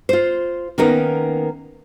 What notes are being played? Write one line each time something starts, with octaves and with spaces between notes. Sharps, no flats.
F4 C5
D#3 A#3 B3 C#4 D#4 A#4